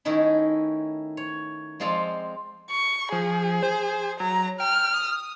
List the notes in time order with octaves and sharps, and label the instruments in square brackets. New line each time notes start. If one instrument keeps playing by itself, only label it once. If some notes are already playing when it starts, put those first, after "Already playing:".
[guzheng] D#3 A3 C#4 D#4 E4
C#5
F3 G#3 C4 F4 D5 F5
[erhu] C#6
[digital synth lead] F3 [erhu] G#4
[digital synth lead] C5
[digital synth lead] F#3 [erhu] A#5
[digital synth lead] G5 [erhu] F6
[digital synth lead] D#6